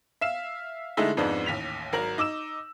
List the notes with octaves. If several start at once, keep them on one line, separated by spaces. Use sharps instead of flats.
E5 F5 E7
D3 G#3 A3 D#4 E4
F2 G#2 B3 D4 D#4
A1 D#2 B6 F7
G#1 F#3 A#4 A#5 F#7
D#4 D6 E6 E7